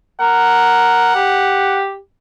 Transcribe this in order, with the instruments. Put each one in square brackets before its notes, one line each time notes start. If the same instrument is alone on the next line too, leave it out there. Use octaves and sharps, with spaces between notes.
[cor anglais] A#4 [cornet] F#5
[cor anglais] G4